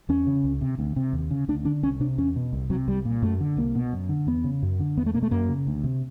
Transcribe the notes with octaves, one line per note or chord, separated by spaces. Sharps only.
E2 C#4
C#3
C#2
C3
D2
C3
D#2
C#3
D2 D4
D3 D4
C2 C#4
C3 D4
E2 C#4
B2
C2
C3 F#3
C2 G3
A#2
F#2 A3
D3
C2 A#3
B2
F#2
D3
E2 B3
C#3
F#2
D3
E2 B3
A3
B2 A#3
A3
F#2 A#3
C#3
D2
C3